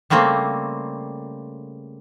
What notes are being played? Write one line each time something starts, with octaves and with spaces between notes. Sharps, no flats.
C#3 G3 A3 A#3 C4